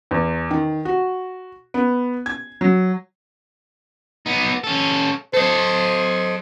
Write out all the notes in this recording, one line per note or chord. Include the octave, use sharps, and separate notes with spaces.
E2
D#3
F#4
B3
G#6
F#3
B3 D#4
C#4 A4
A4 C5 D#5